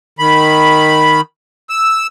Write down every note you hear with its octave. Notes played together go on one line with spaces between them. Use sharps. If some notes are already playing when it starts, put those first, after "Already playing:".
D#3 B5
E6